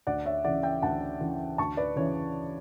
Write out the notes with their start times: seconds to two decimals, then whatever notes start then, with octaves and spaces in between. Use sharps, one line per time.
0.07 D2 D5 F#5
0.25 C#5 E5
0.45 C#3 E3 D5 F#5
0.63 E5 G5
0.82 D2 F#5 A5
1.21 C#3 E3
1.58 D2 A5 C#6
1.77 B4 D5
1.96 C#3 E3 C#5